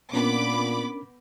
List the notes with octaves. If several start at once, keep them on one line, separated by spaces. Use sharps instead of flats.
A#2 B3 C#4 D4 A#4 B5 D6